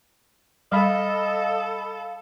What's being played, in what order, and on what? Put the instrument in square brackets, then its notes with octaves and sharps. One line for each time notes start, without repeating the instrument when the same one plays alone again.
[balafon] G3 [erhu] A4 [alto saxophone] D#5 [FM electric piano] F5 B5